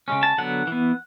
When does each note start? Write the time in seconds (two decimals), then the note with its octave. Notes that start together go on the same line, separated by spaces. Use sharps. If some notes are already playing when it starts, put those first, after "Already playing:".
0.08 C#3 G#3 C#4
0.23 A5
0.38 D3 F#3 B3 F#5
0.67 E3 B3